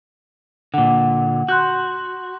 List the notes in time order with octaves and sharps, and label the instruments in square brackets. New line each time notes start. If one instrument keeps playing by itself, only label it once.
[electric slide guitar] A#2 D3 [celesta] F#5
[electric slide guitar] F#4 [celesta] C6 F#6 G6